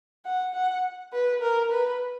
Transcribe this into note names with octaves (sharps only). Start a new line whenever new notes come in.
F#5
F#5
B4
A#4
B4